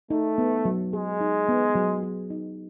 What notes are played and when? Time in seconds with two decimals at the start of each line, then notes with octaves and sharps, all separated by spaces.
0.10 A3 D#4
0.38 B3
0.65 F#3
0.93 G#3 G#4
1.21 D#4
1.49 B3
1.75 F#3
2.03 G#4
2.30 D#4